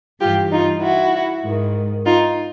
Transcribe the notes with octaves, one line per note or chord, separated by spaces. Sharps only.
G2 E3 F4 G4
D#4 F4
E4 F#4
G#2 D#3
D#4 F4